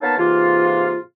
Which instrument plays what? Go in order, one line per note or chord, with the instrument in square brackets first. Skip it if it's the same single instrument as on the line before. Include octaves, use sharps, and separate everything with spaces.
[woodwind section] A#3 B3 D#4 C#5 F5 A5
G#2 C3 E3 A#3 F4